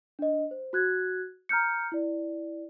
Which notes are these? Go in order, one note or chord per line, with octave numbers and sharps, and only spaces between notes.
D4 D#5
C5
F#4 F#6 G#6
A#5 F6 G6 C#7
E4 D5